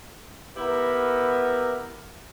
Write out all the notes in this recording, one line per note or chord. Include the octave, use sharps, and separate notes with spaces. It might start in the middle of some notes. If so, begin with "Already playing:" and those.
B3 E4 G4 A#4 B4